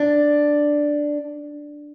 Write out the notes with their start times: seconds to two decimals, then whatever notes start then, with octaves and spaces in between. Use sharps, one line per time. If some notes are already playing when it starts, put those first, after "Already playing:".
Already playing: D4